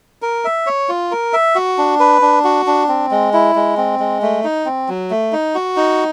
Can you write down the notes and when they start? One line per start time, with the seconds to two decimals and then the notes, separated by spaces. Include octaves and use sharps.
0.22 A#4
0.45 E5
0.66 C#5
0.89 F4
1.11 A#4
1.33 E5
1.55 F#4
1.78 D4
2.00 B4
2.22 D4
2.44 F#4
2.67 D4
2.88 C4
3.11 G#3
3.33 E4
3.55 G#3
3.77 C4
3.99 G#3
4.22 A3
4.44 D#4
4.66 C4
4.88 F#3
5.10 A3
5.32 D#4
5.55 F#4
5.76 D#4